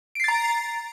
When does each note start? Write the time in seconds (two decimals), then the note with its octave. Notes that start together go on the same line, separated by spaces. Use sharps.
0.15 D7
0.20 C7
0.24 A6
0.28 A#5